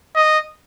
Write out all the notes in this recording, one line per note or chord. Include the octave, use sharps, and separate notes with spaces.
D#5